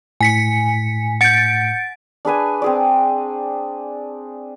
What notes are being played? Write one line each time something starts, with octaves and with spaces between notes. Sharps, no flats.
A2 G#5 B6 C#7
F#5 G6 A6 C#7 D7
D4 G#4 B4 G#5
C4 G#4 D5